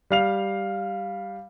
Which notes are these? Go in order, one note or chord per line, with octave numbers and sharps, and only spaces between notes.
G3 F5 F7